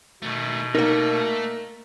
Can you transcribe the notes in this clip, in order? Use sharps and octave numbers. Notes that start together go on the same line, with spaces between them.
B2 D#3 A3
A3 A#3 D#4 A4 A#4